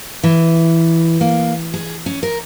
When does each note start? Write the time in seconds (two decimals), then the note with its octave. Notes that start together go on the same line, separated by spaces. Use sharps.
0.23 E3
1.21 A#3
1.74 G#4
2.06 C#4
2.23 A#4